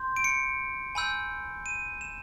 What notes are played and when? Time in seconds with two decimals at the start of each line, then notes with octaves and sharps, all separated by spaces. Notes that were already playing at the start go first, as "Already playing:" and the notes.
Already playing: C6 G6
0.16 D7
0.24 C#7
0.95 G#5 B5 E6 G6
1.66 D#7
2.01 E7